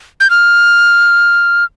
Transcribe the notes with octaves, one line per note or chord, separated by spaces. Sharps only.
G6
F6